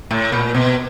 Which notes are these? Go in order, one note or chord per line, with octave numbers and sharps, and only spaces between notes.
A2
A#2
B2